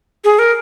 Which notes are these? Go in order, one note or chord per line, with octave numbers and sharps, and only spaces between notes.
G#4
A#4